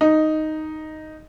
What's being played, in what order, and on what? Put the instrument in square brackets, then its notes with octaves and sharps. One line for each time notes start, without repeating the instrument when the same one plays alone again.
[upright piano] D#4